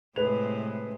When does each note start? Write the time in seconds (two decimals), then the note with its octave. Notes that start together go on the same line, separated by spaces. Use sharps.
0.16 A2 C3 G#3 B4 F7